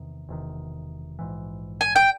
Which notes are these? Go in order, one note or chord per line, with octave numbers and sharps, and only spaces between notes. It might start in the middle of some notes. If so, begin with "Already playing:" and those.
Already playing: E2 C3 D#3
E1 E2 C3 D#3
A#1 G#2 E3
G#5
G5